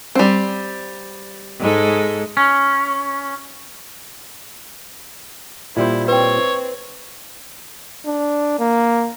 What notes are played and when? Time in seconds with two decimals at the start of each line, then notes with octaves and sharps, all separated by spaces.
0.15 G3 C4
1.60 G#2 G#3 A4
2.37 C#4
5.77 A#2 G3 E4 C5
6.08 C4 B4 C#5 G5
8.06 D4
8.59 A#3